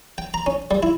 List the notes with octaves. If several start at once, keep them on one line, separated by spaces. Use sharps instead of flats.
G5
A#5
C#4
G3
E4